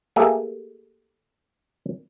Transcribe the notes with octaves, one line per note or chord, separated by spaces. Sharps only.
A3 A#3 G4 G#4 E5